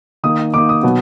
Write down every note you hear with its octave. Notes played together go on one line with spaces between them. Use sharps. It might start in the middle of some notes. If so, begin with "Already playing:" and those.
D#3 A#3 D#4 D#6
D#3 A#3 D#4 D6
D#6
B2 F#3 B3